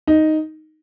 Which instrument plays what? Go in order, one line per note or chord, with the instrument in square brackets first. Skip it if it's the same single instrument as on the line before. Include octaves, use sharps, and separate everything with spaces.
[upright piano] D#4